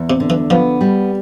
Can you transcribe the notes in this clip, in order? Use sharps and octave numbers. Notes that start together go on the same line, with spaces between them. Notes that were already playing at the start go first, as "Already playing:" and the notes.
Already playing: E2
C3
D3
E3
F3 B3
G3